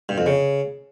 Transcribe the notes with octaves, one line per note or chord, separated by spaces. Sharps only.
G2
F2
C#3